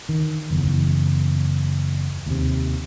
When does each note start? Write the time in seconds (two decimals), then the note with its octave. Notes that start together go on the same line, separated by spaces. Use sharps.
0.09 D#3
0.51 F#1 E2
2.26 D#2 C3